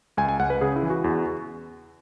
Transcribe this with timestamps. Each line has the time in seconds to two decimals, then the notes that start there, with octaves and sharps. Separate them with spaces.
0.17 C#2 G#5
0.29 G#5
0.39 C#2 F#5
0.50 B4
0.61 C#3 G#4
0.76 E4
0.83 E3
0.90 F#4
1.04 E2